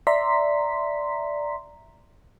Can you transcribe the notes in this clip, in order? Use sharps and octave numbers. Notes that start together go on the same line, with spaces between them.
D5 E5 A#5 C6 B6